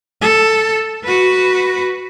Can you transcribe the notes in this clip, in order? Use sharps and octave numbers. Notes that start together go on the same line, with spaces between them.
A4
F#4 B4